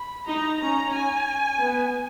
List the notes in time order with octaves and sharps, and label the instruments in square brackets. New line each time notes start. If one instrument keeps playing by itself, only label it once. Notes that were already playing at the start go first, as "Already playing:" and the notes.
Already playing: [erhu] B5
[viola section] D#4 [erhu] A#5
[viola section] C#4 [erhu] A#5
[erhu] G#5
[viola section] B3